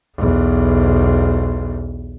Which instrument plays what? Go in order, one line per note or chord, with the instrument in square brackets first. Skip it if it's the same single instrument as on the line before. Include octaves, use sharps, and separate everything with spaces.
[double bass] B1 E2